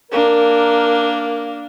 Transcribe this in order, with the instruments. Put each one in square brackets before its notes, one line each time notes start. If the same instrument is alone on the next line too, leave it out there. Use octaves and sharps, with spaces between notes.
[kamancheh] A#3 D4 [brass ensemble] A#4